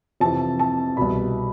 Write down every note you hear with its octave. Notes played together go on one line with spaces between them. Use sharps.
F2 C3 E3 A5
A5
C2 B2 B5